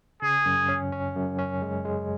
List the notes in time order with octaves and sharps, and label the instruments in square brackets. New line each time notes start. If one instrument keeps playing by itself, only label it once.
[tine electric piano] C#3 [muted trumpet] G#4
[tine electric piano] F#2
C#4
C#4
F#2
C#4
G#3
G#3